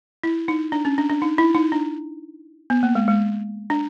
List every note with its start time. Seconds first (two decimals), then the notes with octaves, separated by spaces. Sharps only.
0.23 E4
0.48 D#4
0.72 D4
0.85 C#4
0.98 D4
1.10 D4
1.22 D#4
1.38 E4
1.54 D#4
1.72 D4
2.70 B3
2.83 A#3
2.95 G#3
3.08 G#3
3.70 D4